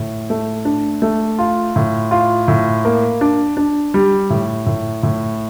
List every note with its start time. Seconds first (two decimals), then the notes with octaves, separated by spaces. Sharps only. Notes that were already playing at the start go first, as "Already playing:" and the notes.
Already playing: A2
0.30 A3
0.65 D4
1.02 A3
1.39 F4
1.76 A2
2.11 F4
2.48 A2
2.85 A#3
3.21 D4
3.57 D4
3.94 G3
4.30 A2
4.66 A2
5.03 A2